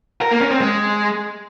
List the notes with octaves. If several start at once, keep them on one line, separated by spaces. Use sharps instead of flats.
A#4
A#3
C#4
C4
G#3